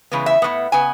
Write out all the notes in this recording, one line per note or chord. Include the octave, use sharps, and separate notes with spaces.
C#3 E3 G#3 B3
E5
A2 G#3 B3
C#3 B3 G#5